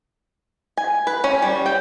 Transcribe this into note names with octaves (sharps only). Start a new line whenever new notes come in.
G#5
B4
C#4
G3
G5